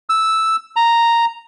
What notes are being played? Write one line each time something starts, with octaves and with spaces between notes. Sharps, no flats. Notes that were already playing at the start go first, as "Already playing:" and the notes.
E6
A#5